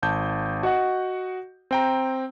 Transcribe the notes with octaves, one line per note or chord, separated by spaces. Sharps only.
G#1 A5 G6
F#4 D#5 F#5
C4 G5 A#5